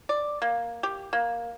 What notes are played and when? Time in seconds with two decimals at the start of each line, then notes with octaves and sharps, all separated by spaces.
0.09 D5
0.42 A#3
0.83 G4
1.13 A#3